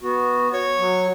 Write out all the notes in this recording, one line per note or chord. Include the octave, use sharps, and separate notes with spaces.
B3 F#4
C#5
F#3